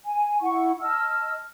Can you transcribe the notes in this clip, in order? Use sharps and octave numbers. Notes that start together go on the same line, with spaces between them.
G#5
E4 F#5 C#6
D#5 A5 E6 F6